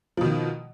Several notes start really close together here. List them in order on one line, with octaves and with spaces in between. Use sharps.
F3 B2 D#3